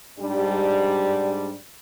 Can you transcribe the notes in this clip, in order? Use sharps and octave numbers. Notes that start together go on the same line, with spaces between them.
G#2 G3 D4